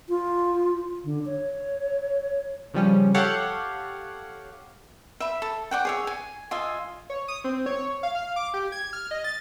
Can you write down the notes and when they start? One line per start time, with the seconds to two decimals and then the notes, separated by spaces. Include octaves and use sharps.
0.09 F4
1.04 D3
1.26 C#5
2.74 C#3 F3 G3 C#4
3.14 G4 A4 C#5 F5 F#5
5.20 E5 B5
5.42 A4
5.71 D5 F#5 G5
5.85 G#4 C#5 E5
6.07 G#5
6.51 F4 D#5 E5 G#5
7.10 C#5
7.28 D#6
7.44 C4
7.66 C#5
8.03 F5
8.15 F5
8.36 D6
8.54 G4
8.72 G#6
8.93 F6
9.11 D#5
9.24 A6